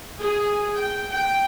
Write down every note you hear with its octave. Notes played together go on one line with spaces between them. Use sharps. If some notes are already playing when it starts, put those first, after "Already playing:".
G#4
G5
G5